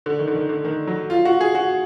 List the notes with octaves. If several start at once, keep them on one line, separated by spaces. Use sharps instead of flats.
D3
D#3
D3
D#3
D3
D#3
F#3
F4
F#4
G#4
F#4